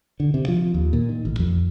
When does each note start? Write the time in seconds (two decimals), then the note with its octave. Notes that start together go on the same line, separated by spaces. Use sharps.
0.20 D3
0.34 C3
0.48 F3
0.74 D#2
0.93 A#2
1.09 D#3
1.25 A1
1.39 F2